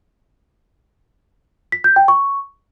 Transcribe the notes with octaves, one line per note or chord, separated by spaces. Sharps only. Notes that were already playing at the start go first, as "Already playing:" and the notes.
B6
G6
G5
C#6